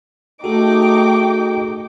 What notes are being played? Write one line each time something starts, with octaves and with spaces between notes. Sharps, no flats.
A3 D#4 F#4 G#4 A4 G5 D6